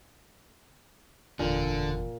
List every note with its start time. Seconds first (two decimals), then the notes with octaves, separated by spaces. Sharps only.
1.39 F#1 E2 A#2 D3